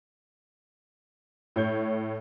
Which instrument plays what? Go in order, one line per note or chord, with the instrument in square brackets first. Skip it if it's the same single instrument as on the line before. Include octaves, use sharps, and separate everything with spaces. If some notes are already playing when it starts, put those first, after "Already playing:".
[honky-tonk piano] A2 C#5 G6